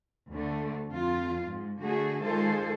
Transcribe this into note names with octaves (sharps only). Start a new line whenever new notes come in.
D2 D3 A3
F2 F4
G#2
D3 A3 F#4 G#4
D#3 G#3 F4 G#4 A4 C5